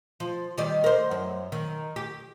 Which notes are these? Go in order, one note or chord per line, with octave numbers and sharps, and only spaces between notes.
F3
D#3 G3 D5
A#4 C5
F#2
D#3
G4